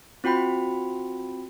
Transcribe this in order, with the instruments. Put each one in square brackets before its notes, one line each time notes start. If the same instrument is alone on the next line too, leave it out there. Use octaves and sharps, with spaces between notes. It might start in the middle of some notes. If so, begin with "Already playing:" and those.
[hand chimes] C4 F4 F#4 G5 B5